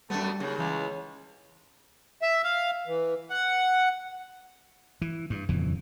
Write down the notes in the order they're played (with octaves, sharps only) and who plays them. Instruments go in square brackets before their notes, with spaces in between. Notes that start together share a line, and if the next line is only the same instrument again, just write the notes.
[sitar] F#2 B3 [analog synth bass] G3 [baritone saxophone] A3
[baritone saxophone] D#2 [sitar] C#3
[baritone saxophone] C#2 [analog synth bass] E3
[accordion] E5
F5
E3
F#5
[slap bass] E3
G2
D#1 F2 C#3 E3